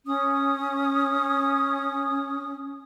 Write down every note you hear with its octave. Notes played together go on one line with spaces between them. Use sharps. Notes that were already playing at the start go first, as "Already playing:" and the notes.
C#4 D#6